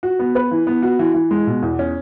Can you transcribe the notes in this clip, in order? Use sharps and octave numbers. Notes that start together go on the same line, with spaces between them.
F#4
B3
B4
E3
B3
F#4
E3
E3
G#3
B2
E2
C#4